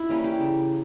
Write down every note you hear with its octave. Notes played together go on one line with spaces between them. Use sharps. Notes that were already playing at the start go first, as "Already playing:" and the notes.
Already playing: E4
E3 G3 A#3 C#4
G4
C#3